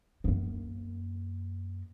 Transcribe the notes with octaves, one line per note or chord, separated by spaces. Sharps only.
F#2 A#3